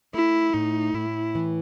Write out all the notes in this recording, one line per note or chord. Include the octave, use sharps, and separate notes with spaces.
A3 E4
A2 D#4
A2 E4
E3